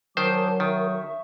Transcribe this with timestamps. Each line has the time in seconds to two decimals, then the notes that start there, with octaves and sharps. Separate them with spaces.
0.17 D#3 F#3 A#4 C5 G#5 A5 D6
0.60 D#3 E5 C#6